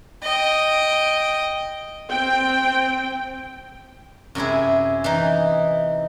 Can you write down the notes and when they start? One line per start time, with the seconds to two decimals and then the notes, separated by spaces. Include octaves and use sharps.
0.23 D#5 G5
2.11 C4 G5
4.35 F#2 C3 E4 G#4
5.04 E3 D#4